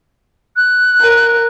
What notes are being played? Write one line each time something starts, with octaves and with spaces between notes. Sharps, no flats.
F#6
A#4